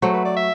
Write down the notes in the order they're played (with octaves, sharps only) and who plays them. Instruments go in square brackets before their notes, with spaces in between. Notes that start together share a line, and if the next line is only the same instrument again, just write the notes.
[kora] F#3 A3 [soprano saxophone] C5
[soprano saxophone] B4
D5
E5